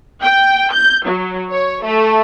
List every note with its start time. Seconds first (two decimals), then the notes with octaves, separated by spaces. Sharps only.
0.23 G5
0.74 G6
1.08 F#3
1.51 C#5
1.84 A3